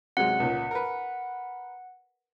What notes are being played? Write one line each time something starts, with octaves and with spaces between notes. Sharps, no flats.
C3 F#3 G#3 F#5
C#2 A#2
A#4 B4